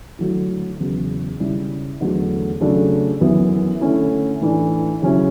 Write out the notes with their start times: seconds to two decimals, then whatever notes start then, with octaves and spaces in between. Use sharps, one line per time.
0.19 D3 F#3 A3 E4
0.80 E2 C#3 F#3
1.40 C#3 G3 C#4 E4
2.00 E2 D3 F#3 A3
2.61 C#3 F#3 A3 D4
3.21 F#2 E3 B3 E4
3.81 D3 A3 C#4 E4
4.41 A2 E3 A3 D4
5.02 C#3 F#3 C#4 E4